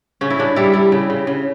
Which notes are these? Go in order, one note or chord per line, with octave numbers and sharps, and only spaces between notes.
C#3 C#4
E4
C#3 D4
G3 E4
G3 E4
C#3
C#3
C#3